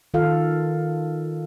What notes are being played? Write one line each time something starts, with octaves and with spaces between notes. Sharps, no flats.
D#3 F4 A4 F5